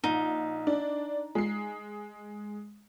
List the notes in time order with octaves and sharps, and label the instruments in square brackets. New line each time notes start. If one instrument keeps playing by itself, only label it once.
[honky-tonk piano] A#1 [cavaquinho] D#4
[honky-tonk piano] D4
G#3 C7